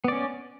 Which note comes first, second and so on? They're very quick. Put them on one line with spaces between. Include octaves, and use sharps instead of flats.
B3 D5 C#4